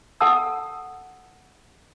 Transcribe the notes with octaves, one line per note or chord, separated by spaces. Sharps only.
A4 F#5 A5 E6